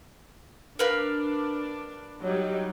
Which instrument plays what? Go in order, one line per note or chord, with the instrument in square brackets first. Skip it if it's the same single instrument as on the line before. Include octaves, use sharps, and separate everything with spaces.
[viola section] D4 [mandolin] A#4 B4 F5
[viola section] F#3 G3 D#4